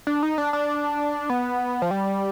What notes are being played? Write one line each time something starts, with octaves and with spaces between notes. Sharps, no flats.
D4
D#4
D4
D4
B3
F3
G3